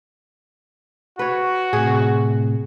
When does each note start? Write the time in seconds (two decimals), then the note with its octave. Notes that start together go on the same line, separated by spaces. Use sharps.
1.19 F#4 B4 C#5
1.73 A2 C3 G#4